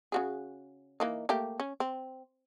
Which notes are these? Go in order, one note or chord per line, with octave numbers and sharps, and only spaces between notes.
C#3 F#4 G#4
E3 A#3 D#4
A3 A#3 G4
C#4
C4